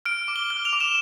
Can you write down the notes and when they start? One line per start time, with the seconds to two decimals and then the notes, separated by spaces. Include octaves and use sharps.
0.05 F6 D7
0.28 D6
0.36 G7
0.50 F6 G7
0.65 F7
0.73 D6
0.80 E7